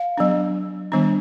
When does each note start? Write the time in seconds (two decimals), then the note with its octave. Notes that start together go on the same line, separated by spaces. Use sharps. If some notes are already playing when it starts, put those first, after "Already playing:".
Already playing: F5
0.17 F#3 B3 D4
0.92 D#3 G3 B3 D4